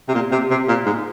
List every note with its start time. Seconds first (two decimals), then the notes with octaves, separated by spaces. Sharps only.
0.08 C3
0.14 A#2
0.32 C3
0.51 C3
0.68 A#2
0.86 G#2